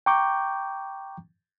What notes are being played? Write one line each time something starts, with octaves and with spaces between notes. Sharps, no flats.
G5 A#5 C#6 D6 G6